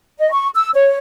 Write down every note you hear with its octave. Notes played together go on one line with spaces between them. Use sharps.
D#5
C#6
E6
C#5